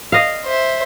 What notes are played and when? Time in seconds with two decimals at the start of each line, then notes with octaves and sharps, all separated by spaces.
0.12 D#5 F5
0.45 C5 E5